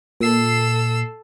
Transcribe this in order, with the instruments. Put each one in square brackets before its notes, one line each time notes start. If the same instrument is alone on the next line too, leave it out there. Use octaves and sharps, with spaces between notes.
[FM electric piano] A#2 C7 [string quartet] A4 E6